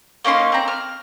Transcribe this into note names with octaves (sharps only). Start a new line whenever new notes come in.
A#3 C#4 D#4 C6
C4 A#5
F6